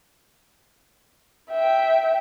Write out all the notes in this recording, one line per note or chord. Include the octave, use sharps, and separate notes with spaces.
E5 G5